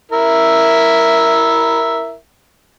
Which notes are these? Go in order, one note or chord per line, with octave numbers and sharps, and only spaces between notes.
E4 A#4 E5